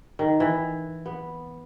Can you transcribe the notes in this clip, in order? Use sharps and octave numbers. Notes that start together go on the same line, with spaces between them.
D#3
E3
B3